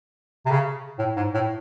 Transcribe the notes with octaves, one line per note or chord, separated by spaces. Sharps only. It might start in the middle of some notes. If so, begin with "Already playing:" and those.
C3
C#3
A2
G#2
A2